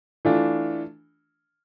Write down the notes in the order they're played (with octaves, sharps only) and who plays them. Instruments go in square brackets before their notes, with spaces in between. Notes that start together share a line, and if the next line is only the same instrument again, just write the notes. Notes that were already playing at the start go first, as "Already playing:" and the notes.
[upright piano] E3 A3 D4 F4